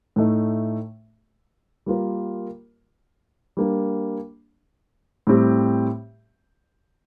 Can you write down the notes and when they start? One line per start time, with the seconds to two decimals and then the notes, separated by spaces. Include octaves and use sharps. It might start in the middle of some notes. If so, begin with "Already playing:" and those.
0.16 A2 A3 D#4
1.86 G3 A#3 F4 A#4
3.57 G3 A#3 D4
5.27 A2 G3 C4 G4